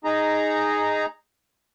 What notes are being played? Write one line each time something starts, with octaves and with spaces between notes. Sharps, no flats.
D#4 G#4 A#5